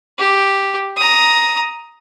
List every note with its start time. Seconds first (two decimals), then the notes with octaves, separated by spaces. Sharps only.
0.19 G4
0.97 A#5 D#6